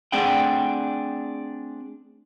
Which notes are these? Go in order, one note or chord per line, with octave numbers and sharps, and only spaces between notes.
A3 C4 D4 G#4 F#5 G5